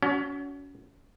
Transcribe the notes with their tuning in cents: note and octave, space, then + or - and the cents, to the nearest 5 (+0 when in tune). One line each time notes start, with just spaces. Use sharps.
C#4 +30 F#4 +0